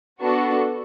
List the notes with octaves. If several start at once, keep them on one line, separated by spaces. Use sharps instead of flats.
B3 D4 F#4 A4 A5